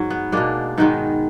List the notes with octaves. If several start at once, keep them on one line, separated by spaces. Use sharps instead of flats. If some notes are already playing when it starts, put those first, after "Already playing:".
Already playing: G#2 F#3
B3
B2 G#3 A#3 D4
G#2 D#3 G#3 B3 D#4